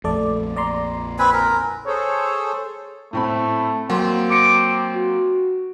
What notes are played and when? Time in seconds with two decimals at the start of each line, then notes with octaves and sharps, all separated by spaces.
0.04 A#1 F2 A3 A4 D5
0.56 D5 A#5 C6
1.19 C4 B4 G#5
1.33 A#4
1.87 G#4 A4 C5 C#5
3.13 A2 A3 C4 B5
3.90 F#3 A#3 C4 F#5 C6
4.30 C6 D6 A#6 C#7
4.95 F#4